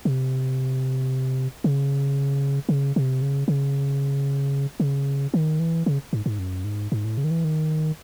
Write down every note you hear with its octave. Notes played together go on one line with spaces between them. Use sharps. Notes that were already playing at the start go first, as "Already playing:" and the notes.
C3
C#3
C#3
C3
C#3
C#3
C#3
D#3
E3
C#3
G#2
G#2
F#2
G#2
G#2
A2
C#3
D#3
E3
D#3